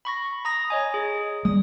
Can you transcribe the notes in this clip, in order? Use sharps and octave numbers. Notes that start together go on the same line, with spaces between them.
B5 C#6 A#6
A#5 D#6 A#6
C#5 D#5 G#5
G#4
G3 G#3 D#6